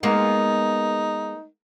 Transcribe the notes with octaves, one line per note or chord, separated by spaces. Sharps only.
G#3 A#3 B3 D#4